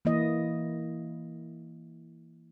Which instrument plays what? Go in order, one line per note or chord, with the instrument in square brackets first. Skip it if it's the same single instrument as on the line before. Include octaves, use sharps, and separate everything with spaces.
[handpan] E3 A#3 E4 D#5